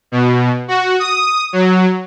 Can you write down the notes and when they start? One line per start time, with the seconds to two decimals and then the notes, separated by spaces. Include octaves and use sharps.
0.12 B2
0.68 F#4
0.99 D#6
1.53 F#3